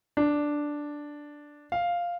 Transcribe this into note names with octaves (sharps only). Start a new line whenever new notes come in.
D4
F5